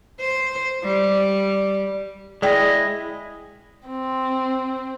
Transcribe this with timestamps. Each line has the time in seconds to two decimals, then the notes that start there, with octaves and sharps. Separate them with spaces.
0.21 C5
0.84 G3
2.42 G#3 E4 G#4 D5 D#5 G5
3.89 C4